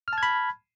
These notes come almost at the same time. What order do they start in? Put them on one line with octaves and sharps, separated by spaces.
F6 A5 G#6 B5